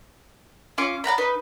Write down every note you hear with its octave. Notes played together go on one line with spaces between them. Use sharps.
C#4 F4 D6
D5 F#5 A#5 B5
D#4 B4